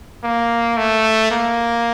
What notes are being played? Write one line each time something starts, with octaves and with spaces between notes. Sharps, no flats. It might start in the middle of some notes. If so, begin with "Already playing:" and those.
A#3
A3
A#3